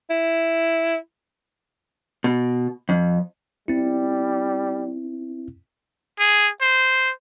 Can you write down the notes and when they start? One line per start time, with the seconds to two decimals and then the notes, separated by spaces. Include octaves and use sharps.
0.10 E4
2.24 B2
2.89 F2
3.68 G3 C4 E4
6.19 G#4
6.61 C5